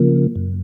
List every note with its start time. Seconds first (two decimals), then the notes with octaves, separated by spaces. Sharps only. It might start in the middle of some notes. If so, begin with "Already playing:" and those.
Already playing: C#3 F3 A#3
0.36 F#2